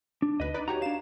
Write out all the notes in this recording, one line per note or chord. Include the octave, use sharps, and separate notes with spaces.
D4
D2 B4 D#5
D#4 B4 D5
F#4 G4 C#5 A#5
D4 F5 E7